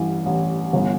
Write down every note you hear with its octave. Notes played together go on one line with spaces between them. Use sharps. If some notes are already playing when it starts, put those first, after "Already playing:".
Already playing: A1 G2 E3
A1
G1